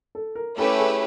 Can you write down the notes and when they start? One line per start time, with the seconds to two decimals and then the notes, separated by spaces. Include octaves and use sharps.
0.15 A4
0.35 A#4
0.57 A3 C#4 E4 G4 A4 B4
0.79 G#4